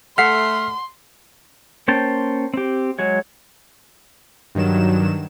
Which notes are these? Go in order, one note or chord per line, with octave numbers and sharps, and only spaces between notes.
A3 F#5 C6 F6 B6 C7
A#3 C#4 C5 G5 A5
C4 G4
F#3 G#3 C#5
G2 D#3 F#3 E7